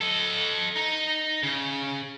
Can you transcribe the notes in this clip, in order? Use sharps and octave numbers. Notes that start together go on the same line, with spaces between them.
A4 D#5
D#4
C#3